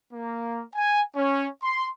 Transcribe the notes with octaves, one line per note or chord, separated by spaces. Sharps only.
A#3
G#5
C#4
C6